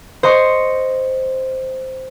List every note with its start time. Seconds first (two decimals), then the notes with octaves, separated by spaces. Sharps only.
0.23 C5 D#5 C6 C#6